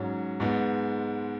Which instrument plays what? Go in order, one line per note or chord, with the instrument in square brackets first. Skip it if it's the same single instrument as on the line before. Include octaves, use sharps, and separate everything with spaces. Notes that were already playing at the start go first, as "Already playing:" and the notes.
Already playing: [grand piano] G#2 F#3 C#4
G#2 G#3 B3